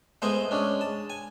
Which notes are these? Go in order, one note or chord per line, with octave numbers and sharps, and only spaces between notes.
G#3 A3 B3 C5 D#5 G#5
G#3 C#4 D4
A5
G#5